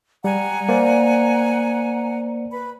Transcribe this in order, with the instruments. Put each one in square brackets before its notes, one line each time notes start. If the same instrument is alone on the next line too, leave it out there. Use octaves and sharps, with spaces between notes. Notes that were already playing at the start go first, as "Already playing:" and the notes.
[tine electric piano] G3 [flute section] F#5 G#5 A#5
[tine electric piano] A#3 C5 D5
[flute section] B4 B5